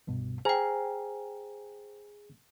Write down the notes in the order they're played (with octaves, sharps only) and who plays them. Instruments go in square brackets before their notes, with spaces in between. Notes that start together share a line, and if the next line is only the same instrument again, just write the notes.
[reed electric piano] C2 G2 B2
[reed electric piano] G#4 G#5 A#5 [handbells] C5 G5